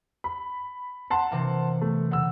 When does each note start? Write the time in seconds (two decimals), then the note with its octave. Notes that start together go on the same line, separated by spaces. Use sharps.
0.24 B5
1.10 F#5 A5 C6
1.31 C3 E3 A#3
1.81 A3
2.11 C#3 F#5 E6